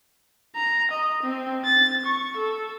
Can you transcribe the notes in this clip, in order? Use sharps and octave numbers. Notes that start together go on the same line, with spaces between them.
A#5
D#5
C4
A6
C#6
A4